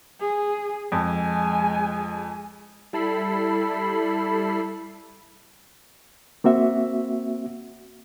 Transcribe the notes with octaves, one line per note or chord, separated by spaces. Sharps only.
G#4
F2 G#3 G#5
G3 E4 A4 B5 C7
A#3 C4 F#4 E5